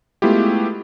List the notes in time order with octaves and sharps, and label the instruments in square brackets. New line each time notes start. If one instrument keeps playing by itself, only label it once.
[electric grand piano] G#3 A3 B3 E4 F4 G4